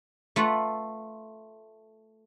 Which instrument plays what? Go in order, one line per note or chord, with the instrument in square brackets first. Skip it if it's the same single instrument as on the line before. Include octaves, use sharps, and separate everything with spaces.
[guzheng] A3 F4 B4 F#5